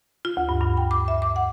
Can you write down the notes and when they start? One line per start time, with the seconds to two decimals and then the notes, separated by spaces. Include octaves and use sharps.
0.25 F4
0.37 D2
0.49 G2
0.61 G2
0.77 G5
0.91 D6
1.08 E5
1.22 D6
1.36 F#5